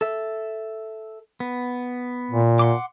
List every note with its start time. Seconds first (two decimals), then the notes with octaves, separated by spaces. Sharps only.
0.01 A4 E5
1.40 B3
2.31 A#2
2.59 F#5 C6 D6